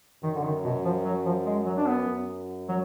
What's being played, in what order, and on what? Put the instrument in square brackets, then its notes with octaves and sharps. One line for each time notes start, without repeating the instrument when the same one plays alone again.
[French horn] F#2 [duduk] D#3
[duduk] D3
D#3
B2
F3
F#3
F3
G#3
F#3
D4
B3
[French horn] F#2
[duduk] F#3